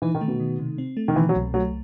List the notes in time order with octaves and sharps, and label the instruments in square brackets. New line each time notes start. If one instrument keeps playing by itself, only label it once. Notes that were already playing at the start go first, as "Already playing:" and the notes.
[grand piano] E3 [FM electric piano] D#4
[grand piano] D#3
[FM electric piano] A3
[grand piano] B2
[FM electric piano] D#3
C3
C4
A3
[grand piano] D#3
[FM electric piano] B2 [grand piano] E3
[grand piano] F#3
[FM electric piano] C2
[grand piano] F#3 [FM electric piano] A3